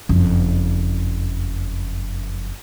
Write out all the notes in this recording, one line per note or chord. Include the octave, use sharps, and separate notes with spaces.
F#1 F2